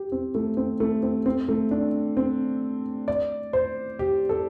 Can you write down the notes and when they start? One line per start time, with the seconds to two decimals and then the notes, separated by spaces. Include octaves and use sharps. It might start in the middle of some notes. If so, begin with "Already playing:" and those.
Already playing: G4
0.12 C4
0.35 A3
0.57 C4
0.80 A3
1.03 C4
1.26 C4
1.48 A3
1.71 D4
2.17 C4
3.08 D5
3.53 C5
3.99 G4
4.29 A4